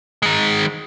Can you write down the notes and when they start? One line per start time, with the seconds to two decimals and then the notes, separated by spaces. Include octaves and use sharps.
0.22 D#3 G#3